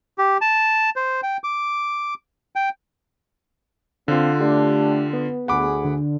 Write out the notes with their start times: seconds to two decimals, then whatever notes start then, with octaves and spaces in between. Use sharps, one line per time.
0.18 G4
0.41 A5
0.96 C5
1.23 G5
1.44 D6
2.56 G5
4.08 D3 C4 F4 F5
4.40 A3 D4 G4
5.13 B3
5.48 D2 G#4 F#5 B5 D6
5.84 D3